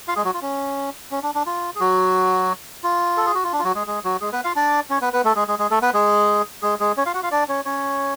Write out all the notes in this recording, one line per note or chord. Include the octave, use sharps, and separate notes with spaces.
F4 F5
G#3 G#4
F#3 F#4
F4
C#4
C#4
D4
D4
F4
G#4
F#3 F#4
F4
A4
G#4
F#4
F4
D4
F4
F#3 F#4
G#3 G#4
G#3 G#4
F#3 F#4
G#3 G#4
B3 B4
F4 F5
D4 D5
C#4 C#5
B3 B4
B3 B4
A3 A4
G#3 G#4
G#3 G#4
G#3 G#4
A3 A4
B3 B4
G#3 G#4
G#3 G#4
G#3 G#4
C#4 C#5
F4 F5
F#4 F#5
F4 F5
D4 D5
C#4 C#5
C#4 C#5